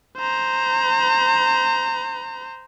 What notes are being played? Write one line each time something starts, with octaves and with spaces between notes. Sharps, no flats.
C5 A#5